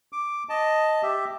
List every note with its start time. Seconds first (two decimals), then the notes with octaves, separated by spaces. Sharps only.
0.13 D6
0.49 D#5 A5
1.03 G4 E5